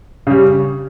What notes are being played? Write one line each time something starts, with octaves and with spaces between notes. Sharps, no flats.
C#3 G3